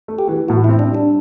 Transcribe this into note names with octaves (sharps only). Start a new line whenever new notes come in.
A3
G4
E3
A2 F#4
E4
C4
D4
G3
D4